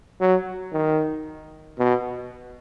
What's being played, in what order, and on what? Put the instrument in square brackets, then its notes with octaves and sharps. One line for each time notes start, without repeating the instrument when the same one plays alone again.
[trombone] F#3
D#3
B2